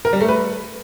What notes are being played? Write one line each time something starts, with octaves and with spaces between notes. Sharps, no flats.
A#4
G3
A3
B4